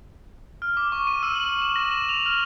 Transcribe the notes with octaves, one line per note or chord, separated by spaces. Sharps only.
F6
D6
C#6
D#7
E6
F#7
E6
E7
A#6
E7
F7
F6